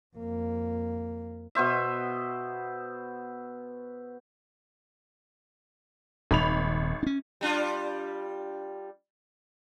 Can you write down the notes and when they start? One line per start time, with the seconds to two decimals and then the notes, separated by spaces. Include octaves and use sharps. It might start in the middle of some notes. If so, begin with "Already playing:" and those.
0.17 F2 A#3
1.55 B2 B3 C5 E5
6.31 D#1 G#1 B5 F7
7.03 C#4 D4
7.41 G3 D4 F4